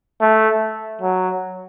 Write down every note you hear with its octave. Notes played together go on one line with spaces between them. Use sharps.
A3
F#3